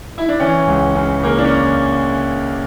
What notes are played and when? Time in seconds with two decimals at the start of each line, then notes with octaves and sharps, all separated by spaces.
0.18 E4
0.29 D4
0.40 E3 C#4
0.67 C#2
0.95 C#3
1.23 C#3 A#3
1.39 D4
1.44 C#4